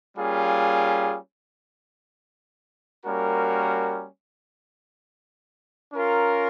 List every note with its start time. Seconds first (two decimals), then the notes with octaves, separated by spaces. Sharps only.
0.16 G3 A#3 C#4 F4 G#4
3.05 G3 A#3 C#4 F#4 A#4
5.94 C#4 F4 A#4